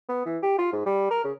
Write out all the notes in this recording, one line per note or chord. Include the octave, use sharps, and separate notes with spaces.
B3
E3
G4
F4
G#2
G3
A#4
C#3